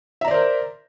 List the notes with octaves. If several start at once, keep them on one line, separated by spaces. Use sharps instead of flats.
A#4 C5 D5 E5 A#5